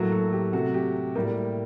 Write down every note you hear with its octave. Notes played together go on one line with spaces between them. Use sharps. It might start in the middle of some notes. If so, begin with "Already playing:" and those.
Already playing: A2 F#3 A#3 F#4 A4
F#4 A4
G4
C3 F#3 A3 F#4
G4
A2 G3 A#3 G4 A#4